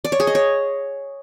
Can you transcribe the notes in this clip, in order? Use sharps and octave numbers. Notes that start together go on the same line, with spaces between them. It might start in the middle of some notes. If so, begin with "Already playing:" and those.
D5
C#5
G#4
D#5
C#5